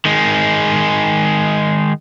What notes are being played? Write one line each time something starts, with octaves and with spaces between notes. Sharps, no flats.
D#3 G#3